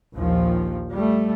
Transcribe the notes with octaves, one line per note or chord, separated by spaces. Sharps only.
A#1 D#2 F3
G3 A3